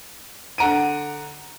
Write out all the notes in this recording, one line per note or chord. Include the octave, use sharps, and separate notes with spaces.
D3 F#5 A#5 D7 D#7